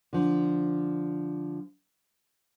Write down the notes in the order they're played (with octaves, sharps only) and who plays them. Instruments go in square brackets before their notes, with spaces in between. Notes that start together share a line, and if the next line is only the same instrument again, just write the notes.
[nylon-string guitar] D3 F3